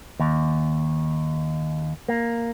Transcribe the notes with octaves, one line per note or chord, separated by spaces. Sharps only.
D#2
A#3